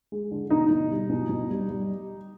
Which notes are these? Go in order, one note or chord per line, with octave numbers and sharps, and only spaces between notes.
G#3
D3
B2 D#4
B2
G3
B2
B2
G3
G3